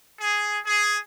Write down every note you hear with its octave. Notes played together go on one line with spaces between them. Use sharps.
G#4
G#4